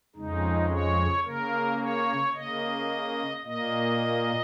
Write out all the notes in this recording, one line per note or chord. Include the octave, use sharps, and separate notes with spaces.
F2 C#3 G#3 D#4
C#5
C#3 A#3 A#4
C#5
C#3 A#3 D#5
A#2 A#3 D#5